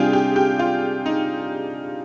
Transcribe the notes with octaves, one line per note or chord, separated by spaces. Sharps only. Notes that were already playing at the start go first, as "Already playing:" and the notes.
Already playing: C3 G3 D4 F4 G4 G#4
G4
G4
F4
D#4